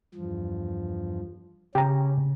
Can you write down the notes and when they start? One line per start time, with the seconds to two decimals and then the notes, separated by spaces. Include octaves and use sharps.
0.15 E2 G2 F3
1.75 C#3 C#4 G4 A#5